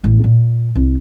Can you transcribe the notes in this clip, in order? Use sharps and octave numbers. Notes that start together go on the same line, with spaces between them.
A1 B3
A#2
C2